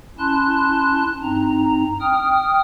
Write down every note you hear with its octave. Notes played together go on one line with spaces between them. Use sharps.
C#4 E4 A5 C6 F#6
G2 C4 D#4 A#5
G5 D#6 F6